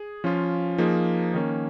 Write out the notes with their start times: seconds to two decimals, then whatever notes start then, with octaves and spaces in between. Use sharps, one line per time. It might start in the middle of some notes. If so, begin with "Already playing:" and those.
Already playing: G#4
0.24 F3 C#4 F4
0.78 F3 A#3 D#4 G#4
1.34 D#3 A#3 C#4